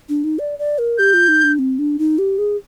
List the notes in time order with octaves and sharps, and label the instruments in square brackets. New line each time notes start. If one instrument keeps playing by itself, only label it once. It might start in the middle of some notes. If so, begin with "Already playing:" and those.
[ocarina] D4
D#4
D5
D5
A#4
[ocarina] G4 [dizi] G6
[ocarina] F4
D#4
D4
C4
D4
D#4
G4
G#4